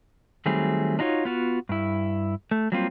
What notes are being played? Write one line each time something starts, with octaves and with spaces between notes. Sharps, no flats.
D#3 F#3 G3 A3 C4 G#4
D4 D#4 F4 F#4 C#5
B3 F4 F#4
G2 E4
A3
F#3 G3 A#3 C4 F4